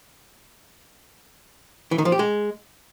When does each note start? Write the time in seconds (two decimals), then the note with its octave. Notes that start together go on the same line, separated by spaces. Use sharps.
1.91 E3
1.98 D#3
2.05 F3
2.12 G4
2.19 G#3